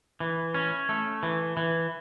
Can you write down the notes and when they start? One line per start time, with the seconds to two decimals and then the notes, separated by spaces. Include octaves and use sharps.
0.20 E3
0.54 C#4
0.89 A3
1.23 E3
1.57 E3